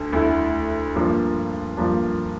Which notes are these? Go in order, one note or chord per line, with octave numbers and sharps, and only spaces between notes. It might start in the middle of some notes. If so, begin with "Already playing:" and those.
Already playing: D2 D3
D2 D3 A3 E4
G2 F3 A#3 D4
G2 F3 A#3 D4